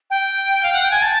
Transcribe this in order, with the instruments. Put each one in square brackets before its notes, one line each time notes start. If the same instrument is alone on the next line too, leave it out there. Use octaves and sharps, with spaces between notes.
[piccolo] G5
F5
F#5
G5
G#5
A5